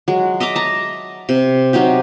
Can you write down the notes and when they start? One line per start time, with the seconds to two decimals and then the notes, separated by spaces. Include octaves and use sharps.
0.08 F#3 G#3
0.40 D#5 E5 A#5 D6
0.55 A5 A#5
1.29 C3
1.73 C3 F#3 D#4 G4